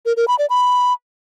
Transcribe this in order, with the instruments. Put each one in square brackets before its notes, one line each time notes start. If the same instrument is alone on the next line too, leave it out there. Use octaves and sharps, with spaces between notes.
[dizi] A#4
A#4
B5
D5
B5